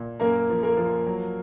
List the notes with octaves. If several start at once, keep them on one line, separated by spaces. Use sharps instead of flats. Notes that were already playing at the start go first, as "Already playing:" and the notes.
Already playing: A#2
F#2 A#3 A#4
F3
A#3 A#4
F3
F#3